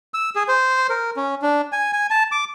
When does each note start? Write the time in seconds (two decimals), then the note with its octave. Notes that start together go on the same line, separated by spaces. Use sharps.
0.14 E6
0.36 G#4
0.48 C5
0.90 A#4
1.17 C#4
1.42 D4
1.72 G#5
1.93 G#5
2.10 A5
2.32 D6